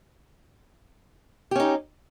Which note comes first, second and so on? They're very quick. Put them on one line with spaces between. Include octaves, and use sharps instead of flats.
G4 C#4 D#4